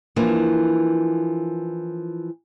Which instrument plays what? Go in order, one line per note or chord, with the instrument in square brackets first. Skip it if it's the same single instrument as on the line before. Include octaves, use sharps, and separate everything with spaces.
[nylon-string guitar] E3 F3 A#3 D4